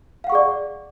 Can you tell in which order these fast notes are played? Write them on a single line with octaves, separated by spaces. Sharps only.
F5 F#5 C#6 G#4 D5